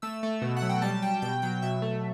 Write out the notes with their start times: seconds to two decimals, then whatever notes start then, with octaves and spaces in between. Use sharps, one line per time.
0.02 A3 E6
0.23 A3
0.42 B2
0.57 F#5
0.62 F#3
0.69 G5
0.82 G3 A5
1.02 G3 G5
1.22 B2 G5
1.42 F#3 G5
1.62 B2 E5
1.82 A3